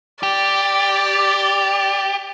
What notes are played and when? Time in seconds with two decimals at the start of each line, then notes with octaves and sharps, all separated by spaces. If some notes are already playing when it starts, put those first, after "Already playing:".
0.23 G4 D5